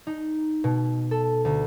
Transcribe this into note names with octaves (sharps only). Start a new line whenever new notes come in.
D#4
B2
A4
D2